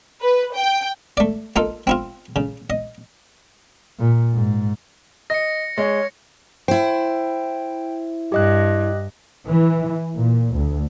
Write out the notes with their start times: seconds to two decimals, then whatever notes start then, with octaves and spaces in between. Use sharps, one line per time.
0.21 B4
0.55 G5
1.17 A3 D5
1.56 A#3 D#4 F4 A4
1.87 C4 E4 F4
2.36 C#3
2.70 D#5
3.99 A#2
4.33 G#2
5.30 D#5 A#6 C#7
5.78 G#3 C#5
6.68 E4 C5 G5
8.32 G2 G4 D#5 F#6
9.49 E3
10.15 A#2
10.54 D2